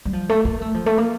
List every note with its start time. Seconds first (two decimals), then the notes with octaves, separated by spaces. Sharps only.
0.05 G3
0.13 F3
0.29 A3
0.45 A#3
0.61 A3
0.74 F3
0.86 A3
0.98 A#3